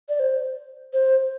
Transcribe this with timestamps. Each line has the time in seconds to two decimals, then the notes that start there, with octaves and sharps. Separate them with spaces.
0.09 D5
0.20 C5
0.93 C5